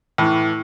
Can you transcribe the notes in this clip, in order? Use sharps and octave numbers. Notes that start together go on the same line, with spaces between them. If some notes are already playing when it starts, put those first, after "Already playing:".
A2 E3